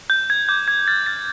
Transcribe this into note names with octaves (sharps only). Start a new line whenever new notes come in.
G6
G6 G#6
D6 G6
D6 G#6
F6 A6
F6 A6